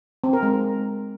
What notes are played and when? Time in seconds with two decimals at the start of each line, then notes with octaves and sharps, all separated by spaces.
0.24 C4
0.33 A#4
0.43 G#3